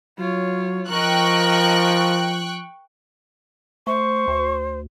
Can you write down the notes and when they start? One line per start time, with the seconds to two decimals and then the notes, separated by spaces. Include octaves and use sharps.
0.18 F#3 F4 C#5
0.89 F3 A#4 D#5 G5 C#6 F#6
3.87 A3 C5 C#6
4.28 D2